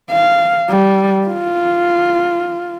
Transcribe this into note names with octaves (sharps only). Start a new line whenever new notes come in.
F5
G3
F4